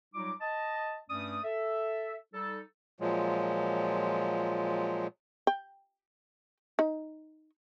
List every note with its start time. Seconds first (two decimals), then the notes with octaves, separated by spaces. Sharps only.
0.14 F#3 G3 D#4 F4 D6
0.41 D#5 A5
1.09 G2 A3 C#4 D5 D#6
1.44 A4 E5
2.34 G3 D#4 A4
3.00 A#2 F3 F#3 G#3
5.47 G5
6.79 D#4